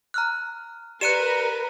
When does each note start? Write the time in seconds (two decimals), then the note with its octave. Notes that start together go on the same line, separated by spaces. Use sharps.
0.14 A#5 F6 F#6
1.01 G4 A#4 B4 D5 F#6 C#7 D#7 E7